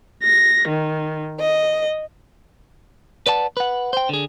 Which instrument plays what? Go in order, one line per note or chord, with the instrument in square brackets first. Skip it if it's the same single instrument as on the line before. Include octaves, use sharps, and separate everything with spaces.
[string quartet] A#6
D#3
D#5
[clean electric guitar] B4 D5 F#5 A5
B4 F#5
C5 G5
D3 G#4